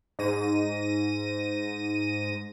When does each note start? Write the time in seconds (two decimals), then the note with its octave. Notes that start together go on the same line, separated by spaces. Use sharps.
0.19 G#2 A#6 D#7